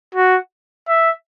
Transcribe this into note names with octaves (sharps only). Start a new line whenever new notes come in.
F#4
E5